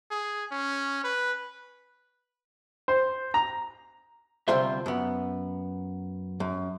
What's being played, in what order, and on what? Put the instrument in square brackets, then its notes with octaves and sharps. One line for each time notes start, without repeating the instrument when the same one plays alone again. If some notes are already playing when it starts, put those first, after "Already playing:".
[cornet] G#4
C#4
B4
[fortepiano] C5
A#5
[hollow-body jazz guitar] D2 C3 G3 F4 C5 E5
F#2 B3
F#2